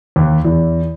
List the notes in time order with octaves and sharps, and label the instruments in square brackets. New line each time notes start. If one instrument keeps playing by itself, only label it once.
[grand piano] D#2
E2